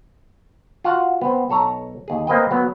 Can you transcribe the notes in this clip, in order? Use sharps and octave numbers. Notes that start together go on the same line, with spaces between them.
F4 F#4 F5 F#5
B3 C4
B1 A4 C#5 A#5
D#2 G#4
A#3 C4 B4 D#5 G5
F#3 B3